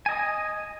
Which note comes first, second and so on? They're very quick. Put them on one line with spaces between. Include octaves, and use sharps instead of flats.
G#5 D#5 D#6